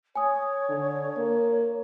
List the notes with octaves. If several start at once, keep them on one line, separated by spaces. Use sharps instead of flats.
C#5 G#5 D#6
D3
A#3